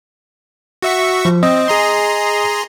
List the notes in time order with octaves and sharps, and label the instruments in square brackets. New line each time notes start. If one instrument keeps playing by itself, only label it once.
[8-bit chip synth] F#4 E5 C#6
[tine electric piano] F3
[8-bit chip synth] C4 [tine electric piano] D#5
[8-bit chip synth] G#4 A#5 C6